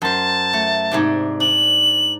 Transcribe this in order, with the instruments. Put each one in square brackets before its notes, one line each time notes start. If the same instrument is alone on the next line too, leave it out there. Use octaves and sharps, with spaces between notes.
[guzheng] F#2 C5 [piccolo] A5
[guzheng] A3
G#2 C3 D4
[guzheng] D4 [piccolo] F#7